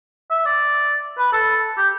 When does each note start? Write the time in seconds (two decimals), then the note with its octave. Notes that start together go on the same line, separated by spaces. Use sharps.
0.31 E5
0.45 D5
1.19 B4
1.33 A4
1.78 G4